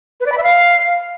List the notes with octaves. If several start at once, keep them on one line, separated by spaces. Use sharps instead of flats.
B4
D5
B5
E5
F5